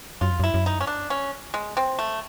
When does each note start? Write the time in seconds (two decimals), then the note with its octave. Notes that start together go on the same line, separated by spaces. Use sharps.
0.21 F#2 F4
0.31 F2
0.40 F#2 E4
0.54 F#2
0.66 D#4
0.81 C#4
0.87 D4
1.10 C#4
1.54 G#3
1.77 C4
1.99 A3